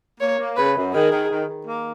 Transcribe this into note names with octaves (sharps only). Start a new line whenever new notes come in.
A#3 C#5
A#3
C#3 B4
F#2
D#3 G#4
D#3
D#3
D#3
A#3